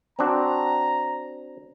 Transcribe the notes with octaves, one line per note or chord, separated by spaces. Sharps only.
C4 D4 F#4 A#5